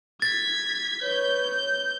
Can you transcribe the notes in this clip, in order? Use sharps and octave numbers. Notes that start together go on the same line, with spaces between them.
G#6 A6 B6
B4 C#5 G6